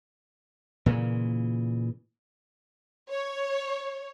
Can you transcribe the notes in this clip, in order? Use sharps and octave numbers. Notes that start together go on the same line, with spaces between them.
A#2 C#3 E3
C#5